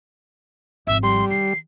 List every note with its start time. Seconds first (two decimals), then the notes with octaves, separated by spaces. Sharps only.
0.87 G#1 F3 E5
1.03 G3 C6
1.31 D#3 C7